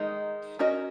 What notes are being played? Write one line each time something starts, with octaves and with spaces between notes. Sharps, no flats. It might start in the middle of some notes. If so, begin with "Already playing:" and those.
Already playing: D#3 G#3 D#4
C#4 F#4 A#4 D#5